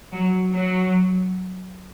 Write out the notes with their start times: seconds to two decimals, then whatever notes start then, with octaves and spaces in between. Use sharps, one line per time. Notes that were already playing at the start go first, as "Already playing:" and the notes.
0.12 F#3
0.53 F#3